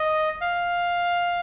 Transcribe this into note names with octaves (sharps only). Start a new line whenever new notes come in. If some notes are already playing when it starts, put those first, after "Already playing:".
Already playing: D#5
F5